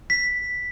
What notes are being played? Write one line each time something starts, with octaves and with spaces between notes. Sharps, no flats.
B6